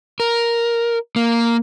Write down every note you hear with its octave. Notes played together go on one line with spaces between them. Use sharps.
A#4
A#3